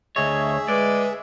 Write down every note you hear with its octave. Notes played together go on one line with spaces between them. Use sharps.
D2 G#4 C#5 D#5 E5
G#3 B4 D5